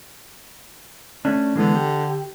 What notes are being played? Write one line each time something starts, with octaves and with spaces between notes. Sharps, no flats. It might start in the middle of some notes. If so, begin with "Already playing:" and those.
A3 C#4 D4
D3 E3 G#3 B3
G4